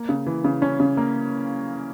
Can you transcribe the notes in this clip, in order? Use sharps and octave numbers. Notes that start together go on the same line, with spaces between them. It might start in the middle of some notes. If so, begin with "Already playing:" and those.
Already playing: A#3
C#3
E3
C#3
C#4
C#3
A#3